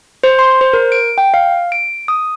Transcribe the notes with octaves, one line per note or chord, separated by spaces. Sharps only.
C5
C6
C5
A#4
D7
G5
F5
D7
D#6